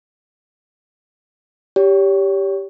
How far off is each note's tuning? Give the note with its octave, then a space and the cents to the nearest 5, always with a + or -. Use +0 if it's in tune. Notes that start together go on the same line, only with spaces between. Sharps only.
G4 +0 C#5 +35